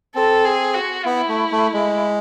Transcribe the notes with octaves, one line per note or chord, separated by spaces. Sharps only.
C4 A4
G#4
F#4
B3 E4
A3
A3
G#3